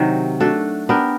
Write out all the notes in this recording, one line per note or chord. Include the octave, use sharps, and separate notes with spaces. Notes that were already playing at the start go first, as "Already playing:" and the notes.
Already playing: C3 D#3 F#3
A3 D4 F#4 A4
B3 D4 G4 A#4